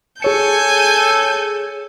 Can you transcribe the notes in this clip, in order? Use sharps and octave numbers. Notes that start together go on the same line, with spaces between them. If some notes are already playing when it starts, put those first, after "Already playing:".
G#4 A4 C#5 G#5 G6 C#7